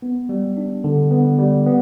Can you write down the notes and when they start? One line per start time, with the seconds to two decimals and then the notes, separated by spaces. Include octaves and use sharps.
0.02 B3
0.29 G3
0.57 D4
0.84 D3
1.11 B3
1.38 G3
1.66 B3